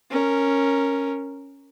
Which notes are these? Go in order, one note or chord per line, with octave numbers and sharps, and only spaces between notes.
C#4 A#4